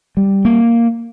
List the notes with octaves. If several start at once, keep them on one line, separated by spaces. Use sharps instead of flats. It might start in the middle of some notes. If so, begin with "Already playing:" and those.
G3
A#3